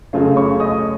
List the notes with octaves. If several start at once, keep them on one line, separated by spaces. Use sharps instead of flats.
F#2 C#3 A3 C#4 F4 F5
C#5 C#6
D#5 D#6